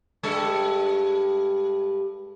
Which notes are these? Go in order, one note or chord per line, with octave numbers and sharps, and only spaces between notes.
G2 G#3 A4